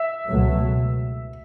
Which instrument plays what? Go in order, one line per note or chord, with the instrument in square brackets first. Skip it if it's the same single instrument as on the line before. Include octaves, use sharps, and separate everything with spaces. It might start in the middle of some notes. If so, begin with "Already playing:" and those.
Already playing: [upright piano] E5
[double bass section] C#2 B2 F#3 A3